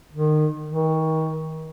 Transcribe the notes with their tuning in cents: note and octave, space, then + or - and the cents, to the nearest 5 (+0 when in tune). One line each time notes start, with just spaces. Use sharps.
D#3 -25
D#3 +35